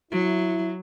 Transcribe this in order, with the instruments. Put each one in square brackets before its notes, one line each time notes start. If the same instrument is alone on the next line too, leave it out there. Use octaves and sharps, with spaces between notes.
[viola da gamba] F#3 [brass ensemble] E4